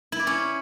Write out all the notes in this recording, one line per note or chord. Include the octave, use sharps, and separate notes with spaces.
E4
D5
C#4